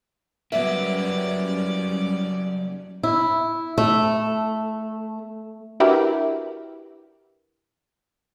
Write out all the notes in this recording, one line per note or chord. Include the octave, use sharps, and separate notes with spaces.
F#3 G3 A#3 B3 C#4 D5 E5
E4
A3
D4 E4 F#4 G4 A#4 B4